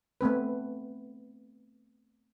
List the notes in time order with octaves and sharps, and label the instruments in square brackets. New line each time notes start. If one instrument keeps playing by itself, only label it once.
[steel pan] A3 B3 C4 B4